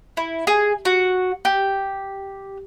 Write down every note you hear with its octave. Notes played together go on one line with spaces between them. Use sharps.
E4
G#4
F#4
G4